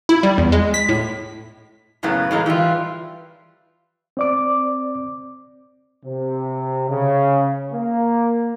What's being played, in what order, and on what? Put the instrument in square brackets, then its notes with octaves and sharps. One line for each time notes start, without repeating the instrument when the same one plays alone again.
[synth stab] E4
G3
E2
G#3
B6
A2
[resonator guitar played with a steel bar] F#2 A2 C#3 A#3 B3
A2 E3 G#3 A#3
E3 G3 D#4 F4
[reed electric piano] C4 D5 D6
[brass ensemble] C3
C#3
A#3